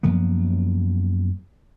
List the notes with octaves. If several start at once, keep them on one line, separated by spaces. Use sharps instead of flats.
F#2 F3 A#3 B3